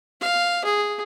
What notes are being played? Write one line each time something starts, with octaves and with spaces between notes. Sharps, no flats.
F5
G#4